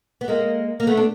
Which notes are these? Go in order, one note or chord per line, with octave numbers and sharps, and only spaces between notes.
B3
G#3 A#3
A#3
A3 B3
D4